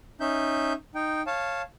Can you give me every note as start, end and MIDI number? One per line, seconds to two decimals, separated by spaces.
0.20 0.73 61
0.20 0.73 63
0.20 0.73 76
0.20 0.73 91
0.95 1.22 63
0.95 1.22 79
1.27 1.62 73
1.27 1.62 77
1.27 1.62 81